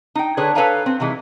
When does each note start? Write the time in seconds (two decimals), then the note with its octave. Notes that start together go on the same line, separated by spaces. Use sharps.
0.15 D#4 G5
0.37 D3 G#4 B4 C#5
0.55 A4 B4 C#5 F5 G#5 A#5
0.86 C4
1.00 C3 D#3 E3 G#3